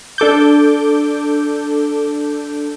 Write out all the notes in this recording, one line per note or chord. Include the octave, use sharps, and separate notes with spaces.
D4 A4 D6 G6